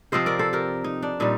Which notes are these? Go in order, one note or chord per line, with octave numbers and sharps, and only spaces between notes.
C3 F3 C4 C5 D#5
A#4 D5
A4 C5
G4 A#4
D#4
D4
A#2 G3 D#4